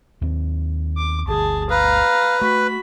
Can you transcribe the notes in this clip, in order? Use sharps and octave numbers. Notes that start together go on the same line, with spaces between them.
D#2 C4
D6
G1 D2 G#4 A5
B4 F5 A#5
A3 F#4 B5